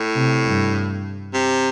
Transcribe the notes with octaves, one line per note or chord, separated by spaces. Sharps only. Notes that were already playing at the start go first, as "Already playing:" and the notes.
Already playing: A2
C3
G2
C3